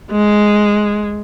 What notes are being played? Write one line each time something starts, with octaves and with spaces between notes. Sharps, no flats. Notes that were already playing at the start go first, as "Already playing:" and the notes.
G#3